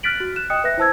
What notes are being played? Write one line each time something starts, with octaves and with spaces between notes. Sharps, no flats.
F6 F#6 A6 B6 D7 F#7
F#4
F#6 E7
D#5 G5 D#6 F#6 C#7
B4 E5 F#6 A#6
E4 C5 A5 E6 G#6